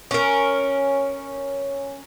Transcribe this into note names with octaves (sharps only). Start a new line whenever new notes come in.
C#4 A#4